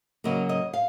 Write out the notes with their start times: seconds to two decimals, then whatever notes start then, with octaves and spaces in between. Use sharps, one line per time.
0.24 C#3 F#3 A#3 D#5
0.49 D#5
0.73 F5